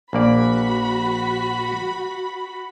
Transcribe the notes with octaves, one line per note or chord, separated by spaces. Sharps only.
A#1 A#3 F#4 D5 B5